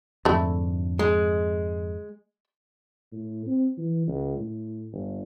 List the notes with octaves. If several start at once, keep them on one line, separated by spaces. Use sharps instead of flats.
F2 G#2 D3 A3 E4
G#3
A2
C4
E3
C#2
A2
G1